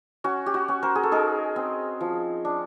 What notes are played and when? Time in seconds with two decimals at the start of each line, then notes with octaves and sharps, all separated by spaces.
0.24 C#4 F#4
0.46 G4
0.54 F#4
0.68 C#4
0.83 A#4 C5
0.95 G#4
1.03 A4
1.12 D#4 G#4 A#4
1.56 C4
2.01 F3
2.45 D4